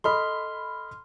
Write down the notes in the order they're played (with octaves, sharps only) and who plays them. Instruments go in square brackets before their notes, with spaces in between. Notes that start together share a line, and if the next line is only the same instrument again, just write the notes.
[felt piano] A4 D#5 B5 [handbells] C6 F6